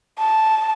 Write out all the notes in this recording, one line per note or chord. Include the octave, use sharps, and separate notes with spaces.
A5